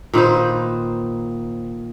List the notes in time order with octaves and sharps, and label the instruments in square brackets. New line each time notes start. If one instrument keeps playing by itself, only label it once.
[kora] A#2 D#3 B4 C5